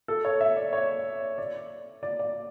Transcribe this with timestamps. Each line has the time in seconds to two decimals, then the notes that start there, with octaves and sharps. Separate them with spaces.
0.08 A4
0.25 C#5
0.41 E5
0.56 D5
0.73 C#5
1.38 D5
2.03 D5
2.19 D5